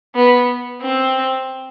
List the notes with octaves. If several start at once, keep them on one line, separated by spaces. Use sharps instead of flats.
B3
C4